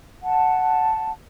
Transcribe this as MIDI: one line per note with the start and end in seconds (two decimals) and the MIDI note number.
0.24 1.10 78
0.24 1.10 81